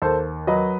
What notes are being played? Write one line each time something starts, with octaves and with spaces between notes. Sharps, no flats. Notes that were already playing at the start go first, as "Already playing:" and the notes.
D#2 A4 C5
F#3 B4 D#5